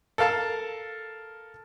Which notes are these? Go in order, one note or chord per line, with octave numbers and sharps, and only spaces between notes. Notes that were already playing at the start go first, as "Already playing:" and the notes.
A4 A#4 F5 A5